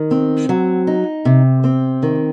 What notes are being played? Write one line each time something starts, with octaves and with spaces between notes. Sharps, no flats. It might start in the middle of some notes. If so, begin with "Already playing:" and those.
Already playing: D#3
C4
F#3
D#4
C3
C4
D#3